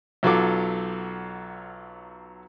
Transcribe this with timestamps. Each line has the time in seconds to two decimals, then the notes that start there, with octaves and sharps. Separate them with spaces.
0.23 B1 F#3 F4 A4 D6